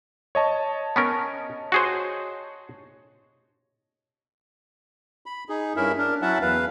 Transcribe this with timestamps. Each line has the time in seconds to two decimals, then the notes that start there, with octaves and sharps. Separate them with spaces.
0.35 C#5 D#5 A5
0.96 B3 C#4 A#4
1.72 F#4 G#4 C5
5.26 B5
5.49 D#4 G#4
5.76 G2 C#4 E4 A#4 E5
5.98 D4 A#4
6.22 F#3 C#4 E4 E5 F#5 A5
6.41 E2 B4 F5